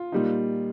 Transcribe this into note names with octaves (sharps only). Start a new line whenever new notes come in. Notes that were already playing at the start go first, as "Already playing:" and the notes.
Already playing: F4
A#2 G3 A#3 D#4